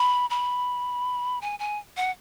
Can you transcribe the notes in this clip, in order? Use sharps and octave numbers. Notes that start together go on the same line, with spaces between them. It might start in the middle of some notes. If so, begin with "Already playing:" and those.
Already playing: B5
B5
G#5
G#5
F#5